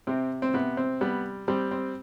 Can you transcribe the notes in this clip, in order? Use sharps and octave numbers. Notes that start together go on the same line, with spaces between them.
C3 C4
C4
C3 B3
C4
G3 B3
G3 C4
C4